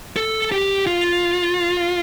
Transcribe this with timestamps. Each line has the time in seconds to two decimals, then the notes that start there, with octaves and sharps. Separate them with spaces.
0.16 A4
0.52 G4
0.87 F4